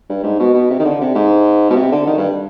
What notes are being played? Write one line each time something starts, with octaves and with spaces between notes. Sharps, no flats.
G2
G#2
B2
B2
C3
D#3
D3
C3
G#2
B2
C3
D3
D#3
G2